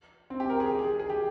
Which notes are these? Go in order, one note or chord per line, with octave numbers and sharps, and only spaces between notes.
C4
G4
A#4
G#4
G4
G#4
G#4
G#4
G4